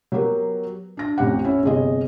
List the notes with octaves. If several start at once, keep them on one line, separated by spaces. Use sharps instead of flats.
F#3 B3 G4 A#4
D4 A#6
A1 F2 G4 F#5
C#4 E4
G1 C3 G#4 D#5